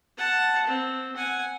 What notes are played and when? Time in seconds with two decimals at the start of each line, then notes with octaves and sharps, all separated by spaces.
0.18 F#5 A5
0.67 C4
1.17 F#5 G#5